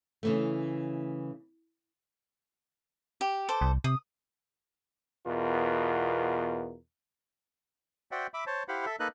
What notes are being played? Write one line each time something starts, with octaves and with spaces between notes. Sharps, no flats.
C#3 E3 A3
G4
A4 C5 D6
C2
C3 D#6
E2 B2 F4 A#4
F#4 C5 D5 E5 F#5 G5
E5 B5 D6
C5 C#5 A5
E4 G4 C5 F5 F#5 B5
A4 E5
A#3 D#4 A4 B4 D#5 F#6